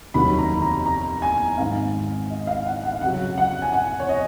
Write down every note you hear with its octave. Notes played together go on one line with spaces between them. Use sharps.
F1 D#2 D#3 F#3 B5
A#5
A#5
A#5
G#5
G#1 G#2 D#3 F5
D#5
F5
F#5
F#5
F5
F1 F2 C#3 F#3 F#5
F#5
G#5
F#5
C#5
D#5